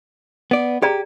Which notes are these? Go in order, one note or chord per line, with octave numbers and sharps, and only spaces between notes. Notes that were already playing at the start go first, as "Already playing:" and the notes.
B3 D5
G4 G#4 D5 A#5